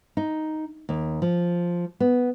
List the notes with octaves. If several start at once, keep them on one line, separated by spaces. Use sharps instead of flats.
D#4
D#2
F3
B3